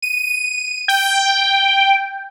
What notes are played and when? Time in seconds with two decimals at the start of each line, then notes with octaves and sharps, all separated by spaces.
0.02 D#7
0.88 G5